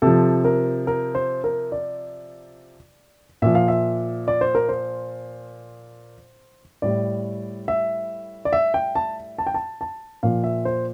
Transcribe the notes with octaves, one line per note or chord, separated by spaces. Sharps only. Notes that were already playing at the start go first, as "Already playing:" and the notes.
C3 F3 A4
A#4
A#4
C5
A#4
D5
A#2 F3 E5
F5
E5
D5
C5
A#4
C5
A2 G3 D5
E5
D5
E5
G5
A5
A5
G5
A5
A5
A#2 F3 F5
E5
C5